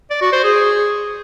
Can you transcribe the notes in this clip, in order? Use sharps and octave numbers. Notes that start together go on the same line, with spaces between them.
D5
F#4
C5
G#4